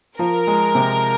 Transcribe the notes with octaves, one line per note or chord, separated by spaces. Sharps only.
F3 A#4
G#3
C3